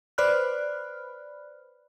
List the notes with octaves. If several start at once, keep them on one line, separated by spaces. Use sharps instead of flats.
B4 C5 D5 B5 F6 F#6